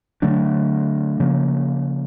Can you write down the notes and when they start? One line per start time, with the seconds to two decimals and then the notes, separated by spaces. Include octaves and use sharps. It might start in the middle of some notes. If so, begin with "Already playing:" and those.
0.22 D3 F#3 A3 D4
1.20 C#3 F3 A#3